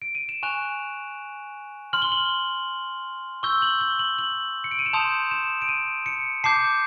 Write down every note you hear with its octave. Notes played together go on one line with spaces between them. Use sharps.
D7
D#7
E7
G#5 C#6 F#6 F7
C6 F6 F#7
G7
F#7
C#6 E6 G6 G7
F#7
G7
F#7
F#7
C#7
D7
D#7
E7
A5 C6 D#6 G6 F7
E7
D7
D#7
C#7
A5 D6 G6 C7